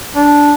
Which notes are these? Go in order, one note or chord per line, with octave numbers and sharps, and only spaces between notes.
D4